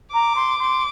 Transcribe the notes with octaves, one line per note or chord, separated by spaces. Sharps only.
A#5 D6
C6
C6